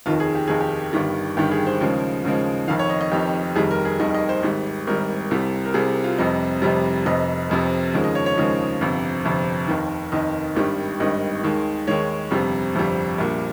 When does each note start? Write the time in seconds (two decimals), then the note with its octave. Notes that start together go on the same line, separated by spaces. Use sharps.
0.06 F1 D#2 D#3 F4
0.20 G#4
0.35 G4
0.48 F1 D#2 D#3 G#4
0.61 G4
0.93 G1 G2 D#3 G3
1.37 G1 G2 D#3 G3 G4
1.51 G#4
1.67 C5
1.81 D#2 C#3 F3 G#3
2.25 D#2 C#3 F3 G#3
2.68 F1 F2 D#3 F5
2.79 C#5
2.90 D#5
3.01 D#5
3.12 F1 F2 D#3 G4
3.55 F1 D#2 D#3 G3 G#4
3.71 A#4
3.85 G#4
4.00 F1 D#2 D#3 G3 D#5
4.14 D#5
4.29 C5
4.43 G#1 G#2 G3
4.87 G#1 G#2 G3 A#4
5.31 C2 C3 G3
5.65 A#4
5.74 C2 C3 G3 G#4
6.04 F4
6.19 F1 F2 C3 G3 D#5
6.62 F1 F2 C3 G3
7.06 F1 F2 C3 D#5
7.50 F1 F2 C3
7.93 D#2 C#3 F3 G#3
8.04 D#5
8.15 C#5
8.26 C#5
8.37 D#2 C#3 F3 G#3
8.81 G1 F2 C3
9.25 G1 F2 C3
9.68 F1 D#2 D#3
10.12 F1 D#2 D#3 D#5
10.56 G#1 G2 D#3 G3
11.00 G#1 G2 D#3 G3 D#5
11.44 D#2 D#3 G#3
11.87 D#2 D#3 G#3 C#5
12.31 G1 F2 C3 G3
12.75 G1 F2 C3 G3
13.18 A#1 A#2 G3